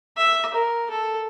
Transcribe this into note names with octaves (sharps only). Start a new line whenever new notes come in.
E5
A#4
A4